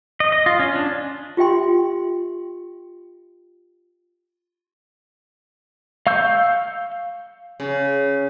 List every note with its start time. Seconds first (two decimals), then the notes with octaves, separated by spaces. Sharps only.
0.20 D#5
0.32 D#5
0.46 F4
0.59 C#4
0.75 D4
1.37 F4 G4 E5 G5 C6
6.07 F5 C#6 E6 G6
7.60 C#3